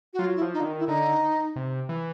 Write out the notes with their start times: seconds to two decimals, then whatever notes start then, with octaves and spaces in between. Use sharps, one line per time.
0.13 F#4
0.19 F#3 F4
0.36 E4
0.41 F3
0.54 D#4
0.60 D3
0.65 D#3
0.79 E4
0.87 D3 D#4
1.56 C3
1.89 E3